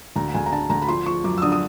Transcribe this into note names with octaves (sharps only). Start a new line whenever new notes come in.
D2 A#5
D2 G#5
A#5
D3 A5
D2 A#5
B5
F3 C6
F3 C#6
F#2 D6
E6
D3 D#6
D#6